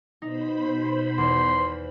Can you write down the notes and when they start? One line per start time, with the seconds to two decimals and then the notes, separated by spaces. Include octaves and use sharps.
0.22 B2 D#4 C5 B5
1.18 E2 C6